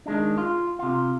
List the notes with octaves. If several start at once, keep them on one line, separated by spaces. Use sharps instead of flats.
D#3 G#3 D4
F4
C3 F4